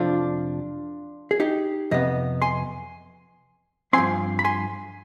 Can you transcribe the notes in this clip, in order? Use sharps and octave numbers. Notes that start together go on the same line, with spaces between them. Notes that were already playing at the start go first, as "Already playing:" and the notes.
Already playing: F2 C3 F3 D4 F4
G#4
D#4 G4
F2 C3 B3 D#5
G#5 C6
G2 F3 C4 G#5 C6
B5
G#5 C6